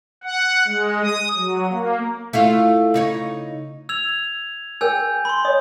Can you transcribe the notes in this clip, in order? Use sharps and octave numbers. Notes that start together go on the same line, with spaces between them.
F#5
G#3
D#6
F#3
A#3
A3 E4 F4
C#3 D#4 C#5
E6 G#6 F7
G#4 A#4 G5 G#5 E6 G6
B5 C6
C#5 D#5 D#6